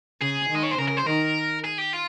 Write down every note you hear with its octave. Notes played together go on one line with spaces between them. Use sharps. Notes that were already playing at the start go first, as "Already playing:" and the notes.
C#3 G#4
D#3
D#5
C#5
C5
C#3 A#4
A#4
C5
D#3 A#4
G#4
G4
F4